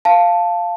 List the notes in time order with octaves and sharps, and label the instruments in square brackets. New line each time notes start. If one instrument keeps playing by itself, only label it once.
[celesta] F5 A5